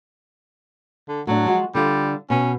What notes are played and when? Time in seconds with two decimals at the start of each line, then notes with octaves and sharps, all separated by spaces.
1.09 D3
1.27 A2 F#3 D4
1.46 F3 G#3 F#4
1.75 D3 G3 F4
2.30 B2 C#4